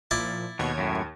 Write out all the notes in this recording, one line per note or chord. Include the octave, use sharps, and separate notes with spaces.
A#2 F3 E4 D6 A6
D#2 B2 C#5 G#6
F#2 A2